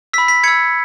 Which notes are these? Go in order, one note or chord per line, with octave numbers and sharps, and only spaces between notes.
B5 E6 B6
B6
B5 E6 G#6 C#7